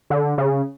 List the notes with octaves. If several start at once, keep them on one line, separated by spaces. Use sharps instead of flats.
D3
C#3